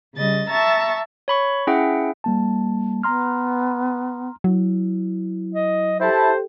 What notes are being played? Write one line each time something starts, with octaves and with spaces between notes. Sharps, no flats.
C#3 G3 D#5 A6
E5 A5 A#5 C#6 A6
C#5 B5 C#6
C#4 E4 G#4 E5 F#5 G5
G3 A#3 A5
B3 A#5 C6 F6
F#3 E4
D#5
E4 G4 A4 C5 G5 A5